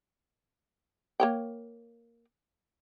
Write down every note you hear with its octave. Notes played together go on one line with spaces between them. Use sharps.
A#3 C#5 G5